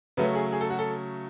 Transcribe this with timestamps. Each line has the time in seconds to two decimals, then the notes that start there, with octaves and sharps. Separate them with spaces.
0.17 C#3 F#3 A3 C#4 B4
0.35 G#4
0.53 G#4
0.61 A4
0.70 F#4
0.79 A4